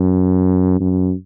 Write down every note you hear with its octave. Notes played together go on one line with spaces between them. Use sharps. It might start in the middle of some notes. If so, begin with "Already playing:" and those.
Already playing: F#2
F#2